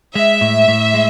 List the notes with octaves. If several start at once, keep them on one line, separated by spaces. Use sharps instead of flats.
G#3 E5
A2
A2
G#3